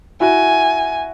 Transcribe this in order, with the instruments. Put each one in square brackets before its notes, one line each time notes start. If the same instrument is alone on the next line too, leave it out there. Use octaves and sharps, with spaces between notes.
[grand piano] E4 F#4 [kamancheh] G#5